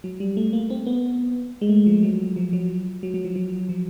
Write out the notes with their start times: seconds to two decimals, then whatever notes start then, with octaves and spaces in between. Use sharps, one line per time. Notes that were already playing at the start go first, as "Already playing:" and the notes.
0.04 F#3
0.20 G3
0.37 A3
0.53 A#3
0.70 C4
0.86 B3
1.61 G#3
1.69 A3
1.86 F3
2.03 F#3
2.36 F3
2.53 F#3
3.03 F#3
3.14 F#3
3.25 F3
3.36 F#3
3.69 F3